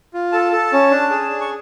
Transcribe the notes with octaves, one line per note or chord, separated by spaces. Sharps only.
F4
A4 A5
A4
C#4
D4
G#4
D4
C#6